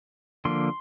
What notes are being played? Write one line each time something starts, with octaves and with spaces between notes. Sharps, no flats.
D3 F3 A#3 C6